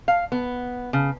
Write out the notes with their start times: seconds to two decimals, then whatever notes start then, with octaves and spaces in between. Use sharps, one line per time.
0.08 F5
0.32 B3
0.93 C#3